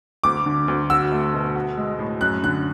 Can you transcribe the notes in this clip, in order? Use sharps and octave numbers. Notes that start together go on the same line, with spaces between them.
D2 D6
D3
D2
F#4 E6
A3
B2
F#4
G#3
A2
F#2 F#6
D3 F#6